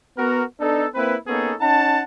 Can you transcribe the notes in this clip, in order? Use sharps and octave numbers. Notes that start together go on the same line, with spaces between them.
B3 F#4 A#4
B3 D4 D#4 A4
A#3 C4 E4 B4
A#3 B3 C#4 D#4 G#4 A4
C#4 D#4 F#5 A5